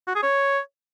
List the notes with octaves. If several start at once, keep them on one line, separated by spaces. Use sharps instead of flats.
F#4
G#4
C#5